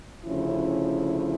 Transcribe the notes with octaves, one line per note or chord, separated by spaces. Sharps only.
D2 C#3 F3 C#4 E4